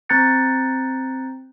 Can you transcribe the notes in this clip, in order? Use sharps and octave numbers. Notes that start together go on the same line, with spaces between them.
C4 A#5 F#6 G6 A6 C#7